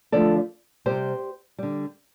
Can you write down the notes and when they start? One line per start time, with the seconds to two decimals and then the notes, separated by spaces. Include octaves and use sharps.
0.12 D3 F3 A3 A4 D5
0.86 C3 G3 G4 C5
1.59 D3 G3